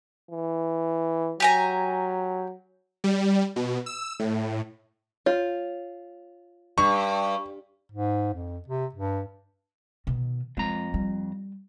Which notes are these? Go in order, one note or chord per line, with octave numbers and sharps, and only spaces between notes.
E3
F#3 G4 G#5 A#5
G3
B2
E6
A2
F4 C#5
G2 C#6
G#2
F2
C3
G2
B2 D#3
F2 G#3 A#5
G3